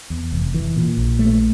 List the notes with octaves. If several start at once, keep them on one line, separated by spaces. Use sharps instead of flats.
E2
F1
E3
A#2
A#1
A3